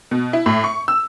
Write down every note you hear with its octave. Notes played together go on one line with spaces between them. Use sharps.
B2
E4
A2
C#6
E6